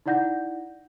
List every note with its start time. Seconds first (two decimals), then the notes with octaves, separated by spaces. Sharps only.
0.06 D#4 E4 D5 F#5 G6 A#6